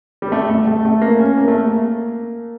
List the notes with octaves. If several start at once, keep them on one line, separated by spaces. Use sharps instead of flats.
G3
A3
A3
A3
A3
A#3
C#4
A#3
A3
A#3